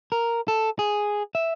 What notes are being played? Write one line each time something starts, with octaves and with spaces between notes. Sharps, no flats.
A#4
A4
G#4
E5